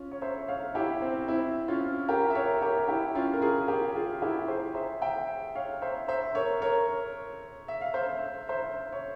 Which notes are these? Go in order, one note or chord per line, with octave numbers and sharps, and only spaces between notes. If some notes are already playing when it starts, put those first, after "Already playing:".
Already playing: C#4 F4
C#5
C5 E5
C#5 F5
E4 G4
C4
C4 E4
C#4 F4
G4 A#4
E5
A#4 C#5
G4 A#4
E4 G4
C#4 F4
A#4
F4 G#4
G4 A#4
F4 G#4
E4 G4
G#4 C5
C5 E5
E5 G5
C#5 F5
C5 E5
C5 E5
A#4 C#5
A#4 C#5
E5
F5
C5 E5
C5 E5
C#5